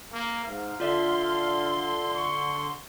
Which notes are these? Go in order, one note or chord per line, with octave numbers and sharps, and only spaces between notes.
A#3
G#2 F5
D3 F4 D5 E5 C6
C#6